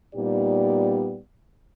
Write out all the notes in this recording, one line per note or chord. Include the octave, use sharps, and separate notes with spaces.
A#2 G3 B3 D#4 G4 D5